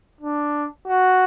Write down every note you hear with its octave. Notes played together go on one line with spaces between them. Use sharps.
D4
F#4